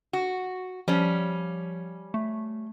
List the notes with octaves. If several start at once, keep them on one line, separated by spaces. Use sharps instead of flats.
F#4
F3 G3 C#4
A3